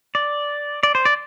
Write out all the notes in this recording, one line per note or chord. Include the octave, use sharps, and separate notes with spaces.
D5
D5
C5
D5